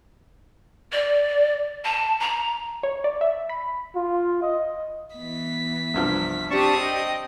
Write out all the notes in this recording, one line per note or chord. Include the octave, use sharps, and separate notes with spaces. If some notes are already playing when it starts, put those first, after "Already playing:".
D5
A5
A#5
C#5
D5
E5
B5
F4
D#5
E3 B3 B6
C2 G2 F3
C4 D4 G4 A5 C#6 D#6
D#5 G5